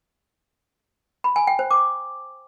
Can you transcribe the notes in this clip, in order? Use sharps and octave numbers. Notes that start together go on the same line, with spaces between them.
B5
G#5
G5
C5
D6